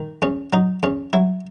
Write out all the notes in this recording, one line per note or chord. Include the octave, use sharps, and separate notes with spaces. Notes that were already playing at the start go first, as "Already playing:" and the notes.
Already playing: D#3
E2 C#4
F#3 D#4
E2 C#4
F#3 E4